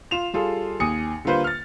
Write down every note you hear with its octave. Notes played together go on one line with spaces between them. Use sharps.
F4 E7 F7
G3 F4 G#4 A4
D#2 G#5 D#6 C#7
D3 G3 A#3 F4 B4 C5
F6 A6